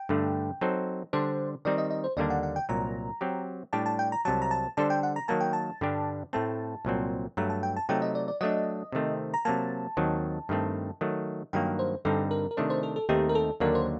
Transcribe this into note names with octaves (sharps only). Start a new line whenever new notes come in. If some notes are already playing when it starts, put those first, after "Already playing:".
Already playing: G5
G2 D3 A3
F#3 C4 D#4 A4 C5
D3 G3 D4 C5
D#3 G3 C4 D#4 D5
D#5
D#5
C5
D#2 D3 G3 A#3 D4 D5
F#5
F#5
G5
C2 A#2 F#3 A#5
F#3 C4 G4
A2 G3 D4 G4 A5
A5
G5
A#5
C2 C3 F#3 A5
A#5
A5
D3 G3 D4 A4 C5 A5
G5
F#5
A#5
D#3 F#3 A#3 A5
G5
A5
G2 D3 G3 D4 G4
A2 A3 C4 A5
C2 A#2 F#3 C4
G2 F#3 A3 A#5
A5
G5
A5
C3 F#3 A3 D#4 G5
D#5
D5
D5
F#3 A3 D4 D#5
C3 D#3 A3 C4
A#5
C3 F#3 A#3 A5
D#2 D#3 F#3 C4
G2 D#3 A3 C4
D#3 F#3 A3
G2 D#3 F#3 A#3 G5
C5
G2 D3 G3 C4 D#4 A4
A#4
A#4
C3 D#3 A3 D4 C5
C5
A4
A4
D#2 D#3 A3 C4 D#4 G4
A#4
A4
D#2 D3 F#3 A#3 D4 A#4
C5